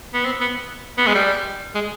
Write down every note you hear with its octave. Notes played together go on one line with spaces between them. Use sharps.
B3
C4
B3
B3
G#3
G3
G#3